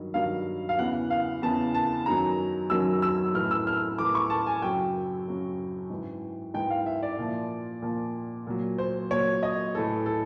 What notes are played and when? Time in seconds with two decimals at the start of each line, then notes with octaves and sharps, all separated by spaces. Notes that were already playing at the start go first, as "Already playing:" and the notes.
Already playing: G2 D#3 F#3
0.14 G2 D#3 F#3 F5
0.69 F5
0.78 E2 C#3 E3 F#5
1.10 F5
1.42 E2 C#3 E3 A5
1.74 A5
2.06 F#2 D#3 F#3 A#5
2.70 F#2 D#3 F#3 E6
3.02 E6
3.34 A2 E3 F6
3.51 E6
3.67 F6
3.98 A2 E3 D6
4.15 C#6
4.30 A5
4.46 G#5
4.62 F#2 C#3 F#3 G5
5.27 F#2 C#3 F#3
5.90 G#2 E3
6.54 G#2 E3 G5
6.70 F5
6.86 E5
7.03 D5
7.18 A#2 F3
7.82 A#2 F3
8.47 A#2 F#3
8.78 C5
9.11 A#2 F#3 C#5
9.43 D#5
9.75 A2 E3 A4
10.06 A4